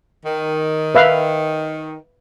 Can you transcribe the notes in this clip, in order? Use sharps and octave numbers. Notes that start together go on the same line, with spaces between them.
D#3
B4 E5 F5